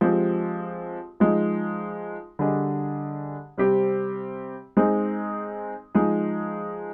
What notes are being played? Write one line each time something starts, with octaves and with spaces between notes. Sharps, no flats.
F3 G#3 C4 G4
F3 G#3 D#4
D3 G3 D4 G#4 D#5
C3 G3 C4 G4 C5
G#3 C4 D#4 G#4
F3 G#3 D#4 G#4